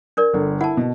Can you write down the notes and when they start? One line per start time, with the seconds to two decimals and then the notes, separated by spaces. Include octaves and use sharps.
0.17 D4 A#4 D5
0.34 G1 D3
0.61 E4 F#5 A5
0.77 B2